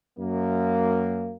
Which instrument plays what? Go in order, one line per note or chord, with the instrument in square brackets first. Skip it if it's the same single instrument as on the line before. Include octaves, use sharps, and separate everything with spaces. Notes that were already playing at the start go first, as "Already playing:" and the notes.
[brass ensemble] F#2 A#3